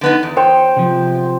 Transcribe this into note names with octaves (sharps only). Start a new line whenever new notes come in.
D3 B3 D#4
E2
C5 C#5 G5
C3 F3